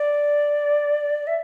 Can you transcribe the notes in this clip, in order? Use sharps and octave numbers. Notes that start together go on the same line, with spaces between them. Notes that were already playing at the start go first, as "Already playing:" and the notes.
Already playing: D5
E5